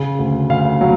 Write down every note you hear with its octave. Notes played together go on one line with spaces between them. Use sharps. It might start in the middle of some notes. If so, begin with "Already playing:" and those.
Already playing: C#3
D2
D2 F5
F#3